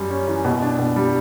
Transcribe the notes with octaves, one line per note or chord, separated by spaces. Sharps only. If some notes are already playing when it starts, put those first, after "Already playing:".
Already playing: F#2 G3
C#4
E3
B2
D4
B2
G3